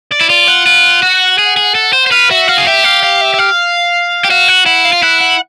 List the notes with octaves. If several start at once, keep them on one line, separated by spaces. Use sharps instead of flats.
D5
E4
F4 D5
F#5
F4
F#4
G#4
G#4
A4
C5
C5
B4 F5
F#4 E5
F#4 F5
G#4
G4 E5
F5
F5
E5
E5
F5
G4
F#4 F5
F#5
E4 F#5
F5
F4
E4 F#5
F#5